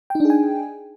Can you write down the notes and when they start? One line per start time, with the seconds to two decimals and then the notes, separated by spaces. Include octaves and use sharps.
0.10 G5
0.15 D#4
0.20 D4
0.25 G#4
0.30 G#5